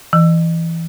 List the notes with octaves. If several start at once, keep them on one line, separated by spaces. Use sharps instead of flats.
E3